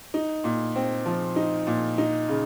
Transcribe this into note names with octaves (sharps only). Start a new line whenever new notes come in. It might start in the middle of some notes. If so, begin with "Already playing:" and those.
D#4
A#2
C4
F3
D#4
A#2
D#4
C#3